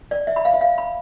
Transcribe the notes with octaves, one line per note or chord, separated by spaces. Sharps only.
D5
E5
B5
F5
E5
F5
B5